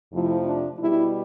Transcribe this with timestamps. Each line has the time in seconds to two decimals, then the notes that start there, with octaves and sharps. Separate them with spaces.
0.13 F2 C3 F3 A3 E4
0.45 D4
0.79 B2 G3 E4